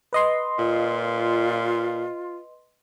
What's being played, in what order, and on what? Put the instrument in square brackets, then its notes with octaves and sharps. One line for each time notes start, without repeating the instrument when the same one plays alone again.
[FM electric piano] B4 D#5 C6
[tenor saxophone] A#2 [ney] F4